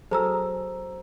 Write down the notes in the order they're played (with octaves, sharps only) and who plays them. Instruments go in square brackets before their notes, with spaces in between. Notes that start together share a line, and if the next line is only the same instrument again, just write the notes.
[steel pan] F#3 G#4 A4 [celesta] C5 A#5 E6